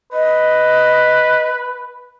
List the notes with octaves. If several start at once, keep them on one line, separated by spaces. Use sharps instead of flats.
B4 D#5